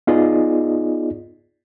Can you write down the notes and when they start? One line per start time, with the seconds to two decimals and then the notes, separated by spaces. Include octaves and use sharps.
0.07 B3 D#4 F4 G#4 D5 D#5